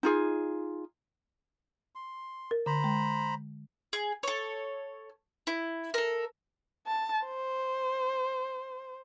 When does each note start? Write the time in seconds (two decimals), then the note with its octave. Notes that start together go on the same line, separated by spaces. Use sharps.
0.03 D#4 F4 G#4
1.95 C6
2.51 A#4
2.66 D3 C5 A#5 B5
2.84 G#3
3.93 G#4
4.23 A4 C#5
5.47 E4
5.94 A4 A#4
6.87 A5
7.25 C5